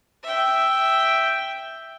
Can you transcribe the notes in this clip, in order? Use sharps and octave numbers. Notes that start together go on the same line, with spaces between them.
E5 G5